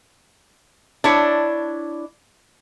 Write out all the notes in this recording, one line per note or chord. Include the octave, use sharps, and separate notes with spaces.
D4 E4 C#5